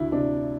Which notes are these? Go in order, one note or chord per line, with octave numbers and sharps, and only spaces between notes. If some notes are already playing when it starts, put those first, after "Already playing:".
Already playing: D2 E4
C3 D4